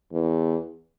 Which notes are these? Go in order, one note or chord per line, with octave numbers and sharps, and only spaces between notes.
E2